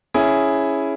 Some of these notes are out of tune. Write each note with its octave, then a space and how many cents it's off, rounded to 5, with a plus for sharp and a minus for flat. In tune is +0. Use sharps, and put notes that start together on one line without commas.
C#4 +0 E4 +0 G#4 +0